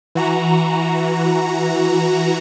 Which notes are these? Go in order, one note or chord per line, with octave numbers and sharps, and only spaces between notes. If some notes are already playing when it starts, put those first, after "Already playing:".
E3 F#4 A#5